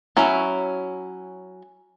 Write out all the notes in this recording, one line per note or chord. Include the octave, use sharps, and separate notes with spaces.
F#3 C#4 E4